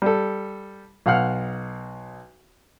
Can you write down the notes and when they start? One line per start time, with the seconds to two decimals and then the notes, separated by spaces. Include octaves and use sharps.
0.02 G3 A4
1.06 B1 F5 F#5 F6